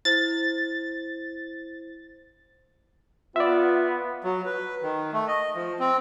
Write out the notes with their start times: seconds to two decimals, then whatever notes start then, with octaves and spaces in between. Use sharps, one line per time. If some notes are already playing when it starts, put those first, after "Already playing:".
0.05 E4 C5 A6
3.36 B3 F4 D5 E5
4.24 F#3
4.46 B4
4.82 D#3
5.13 A3
5.28 D#5
5.55 F3
5.80 C4